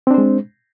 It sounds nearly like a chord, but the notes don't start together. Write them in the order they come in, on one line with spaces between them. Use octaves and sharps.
C4 D4 C5 G#3